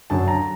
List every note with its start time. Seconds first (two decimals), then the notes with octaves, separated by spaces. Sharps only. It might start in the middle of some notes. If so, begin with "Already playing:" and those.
0.10 F#2 D3 F#3 A5
0.28 A#5